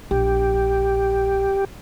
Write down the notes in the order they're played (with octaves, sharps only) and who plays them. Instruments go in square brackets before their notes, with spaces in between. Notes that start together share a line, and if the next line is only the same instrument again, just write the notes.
[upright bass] A#1 [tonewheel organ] G4